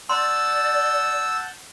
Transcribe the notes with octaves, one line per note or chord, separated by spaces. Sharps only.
D5 F#5 A5 C6 E6 G6